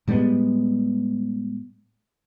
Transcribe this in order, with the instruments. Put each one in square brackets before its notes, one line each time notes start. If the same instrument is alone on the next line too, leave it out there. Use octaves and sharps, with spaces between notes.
[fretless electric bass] A2 G3 G#3 B3